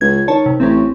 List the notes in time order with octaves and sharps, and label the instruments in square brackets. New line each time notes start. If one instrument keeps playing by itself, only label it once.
[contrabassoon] C#2 [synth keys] G#6
[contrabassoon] D#3 [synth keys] C#5 A5
[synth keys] C3
[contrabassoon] A1 [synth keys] C4 C#4